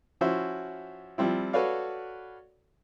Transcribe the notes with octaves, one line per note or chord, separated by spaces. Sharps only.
F3 C#4 E4 F#4 C5 E5
F3 G3 C4 E4
F#4 A4 B4 C#5 D5 F5